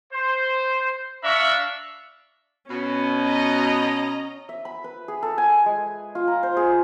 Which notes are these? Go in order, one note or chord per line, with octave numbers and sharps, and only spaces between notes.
C5
D4 E5 F5 A#5 B5 C#6
B2 C#4
D#5 A#5
E5
B5
B4
G#4
A4
G#5
G#3
F4
A#5
C5
G#4